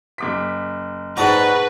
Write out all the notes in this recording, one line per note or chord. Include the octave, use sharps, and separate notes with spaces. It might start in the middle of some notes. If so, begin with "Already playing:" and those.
F#1 D6 B6
G#2 F#4 B4 D5 A5 A#5